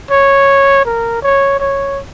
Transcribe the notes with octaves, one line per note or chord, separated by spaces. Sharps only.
C#5
A#4
C#5
C#5